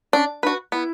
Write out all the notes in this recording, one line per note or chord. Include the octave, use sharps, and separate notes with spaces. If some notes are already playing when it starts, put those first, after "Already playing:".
C#4 D4
D4 F#4 B4
B3 E4